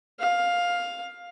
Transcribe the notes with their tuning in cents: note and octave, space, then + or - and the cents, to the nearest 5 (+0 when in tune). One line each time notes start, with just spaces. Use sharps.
F5 +10